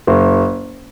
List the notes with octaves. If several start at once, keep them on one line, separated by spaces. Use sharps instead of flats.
F#1